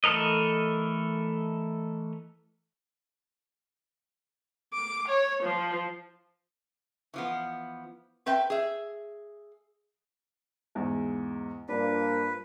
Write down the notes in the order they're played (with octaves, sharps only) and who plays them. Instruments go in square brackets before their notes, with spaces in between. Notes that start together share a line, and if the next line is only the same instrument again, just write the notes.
[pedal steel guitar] E3 A3 A4 A#4 D#5
[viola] D6
C#5
F3
[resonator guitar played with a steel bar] E3 F3 B3
C4 B4 E5 G5
G#4 E5
[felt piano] E2 G#2
[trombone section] G2 F3 A#3 [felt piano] D4 [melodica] B4